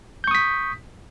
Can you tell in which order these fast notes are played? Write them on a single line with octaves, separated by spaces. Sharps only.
G6 C#6 D#6 B6